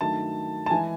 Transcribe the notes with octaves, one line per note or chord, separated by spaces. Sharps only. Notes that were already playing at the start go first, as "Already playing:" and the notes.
G2 D#3 F#3 A3 A5
A5
E3 G#3 G#5